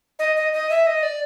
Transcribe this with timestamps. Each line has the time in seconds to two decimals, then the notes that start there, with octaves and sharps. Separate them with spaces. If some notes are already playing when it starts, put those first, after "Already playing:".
0.19 D#5
0.36 D#5
0.53 D#5
0.70 E5
0.87 D#5
1.03 D5